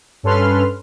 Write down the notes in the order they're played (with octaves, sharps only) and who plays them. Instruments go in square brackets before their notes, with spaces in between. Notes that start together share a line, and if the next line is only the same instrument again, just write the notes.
[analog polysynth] G2 C#4 A4 B4 C6 F6